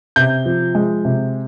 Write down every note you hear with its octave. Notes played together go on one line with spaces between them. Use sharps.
C3 G6
F3
G#3
C3